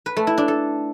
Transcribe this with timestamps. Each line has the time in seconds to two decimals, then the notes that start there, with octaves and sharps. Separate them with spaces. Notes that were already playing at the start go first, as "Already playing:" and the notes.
0.06 B4
0.17 A3
0.27 E4
0.38 D4
0.48 A4